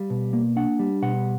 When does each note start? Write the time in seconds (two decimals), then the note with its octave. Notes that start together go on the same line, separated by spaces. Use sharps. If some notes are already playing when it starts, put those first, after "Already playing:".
Already playing: G3 F5
0.10 B2
0.33 A#3
0.56 D4 F#5
0.79 G3
1.02 B2 F#5